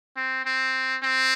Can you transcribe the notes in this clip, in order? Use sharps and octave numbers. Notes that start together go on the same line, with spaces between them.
C4
C4
C4